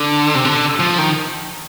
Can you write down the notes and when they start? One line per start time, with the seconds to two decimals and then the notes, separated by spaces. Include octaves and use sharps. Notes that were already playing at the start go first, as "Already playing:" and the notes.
Already playing: D3
0.35 C3
0.45 D3
0.80 F3
0.98 D#3